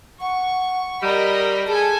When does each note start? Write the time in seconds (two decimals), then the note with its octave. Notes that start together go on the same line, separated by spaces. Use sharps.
0.21 F#5 C#6
1.02 G3 A#4 D5 D#5 B5
1.68 G#4 A4 G#5